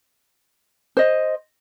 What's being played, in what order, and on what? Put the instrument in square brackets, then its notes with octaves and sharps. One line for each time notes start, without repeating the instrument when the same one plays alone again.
[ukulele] C5 D#5